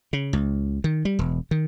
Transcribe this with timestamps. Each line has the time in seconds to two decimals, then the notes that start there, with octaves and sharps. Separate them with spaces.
0.13 C#3
0.33 C#2
0.84 D#3
1.05 G3
1.19 E1
1.51 D#3